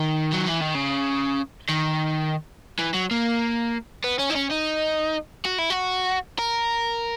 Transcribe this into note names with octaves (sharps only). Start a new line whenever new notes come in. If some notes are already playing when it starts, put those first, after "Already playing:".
Already playing: D#3
F#3
E3
D#3
C#3
D#3
E3
F#3
A#3
B3
C#4
D#4
C#4
D#4
F#4
E4
F#4
A#4